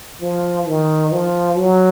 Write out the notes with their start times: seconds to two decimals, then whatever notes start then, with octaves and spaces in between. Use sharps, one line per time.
0.21 F3
0.67 D#3
1.12 F3
1.58 F#3